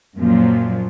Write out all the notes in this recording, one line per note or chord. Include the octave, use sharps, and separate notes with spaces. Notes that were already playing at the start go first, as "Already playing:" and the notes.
F#2 A#2 F3 F#3